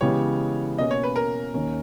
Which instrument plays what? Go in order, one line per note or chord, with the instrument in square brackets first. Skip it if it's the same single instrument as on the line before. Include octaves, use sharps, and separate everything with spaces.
[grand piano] C#3 E3 G#3 B3 G4 [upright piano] C#5
[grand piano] B2 A#3 C#4 [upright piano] D#5
[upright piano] C#5
B4
A#4
[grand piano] D#2 D#3 A#3 C#4